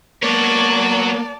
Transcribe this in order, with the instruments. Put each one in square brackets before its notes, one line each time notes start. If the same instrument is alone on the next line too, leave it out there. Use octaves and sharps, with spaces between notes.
[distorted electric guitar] F#3 C#5 [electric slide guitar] A#3 B3 A#4 [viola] D5 A5